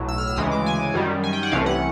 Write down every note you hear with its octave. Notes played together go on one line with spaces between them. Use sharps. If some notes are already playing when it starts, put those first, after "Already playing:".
Already playing: B1 A2 F#3
E6
F6
E6
D2 C#3 E3 G#3 D#6
D6
G#5
F#2 D#3 G3
G#5
G5
F#5
C2 C3 E3 A3 C#4 F5
F#5